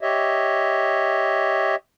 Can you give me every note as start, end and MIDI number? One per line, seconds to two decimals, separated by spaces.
0.01 1.75 67
0.01 1.75 73
0.01 1.75 75
0.01 1.75 76